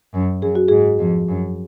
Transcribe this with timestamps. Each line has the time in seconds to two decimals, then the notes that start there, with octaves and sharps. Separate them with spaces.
0.14 F#2
0.42 F#2 G#4
0.55 F#4
0.68 G#2 G#4
0.99 F2
1.28 F#2